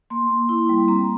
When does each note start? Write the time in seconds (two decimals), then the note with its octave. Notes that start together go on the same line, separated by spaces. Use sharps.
0.10 A#3 C6
0.30 A#3
0.49 E4
0.69 G3
0.88 C4 A#5